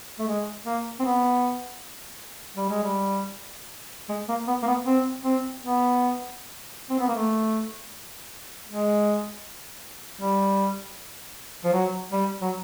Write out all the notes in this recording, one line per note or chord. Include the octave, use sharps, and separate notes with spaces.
A3
G#3
A#3
C4
B3
G3
G#3
G3
G#3
A#3
B3
A#3
B3
C4
C4
B3
C4
B3
A#3
A3
G#3
G3
F3
F#3
G3
F#3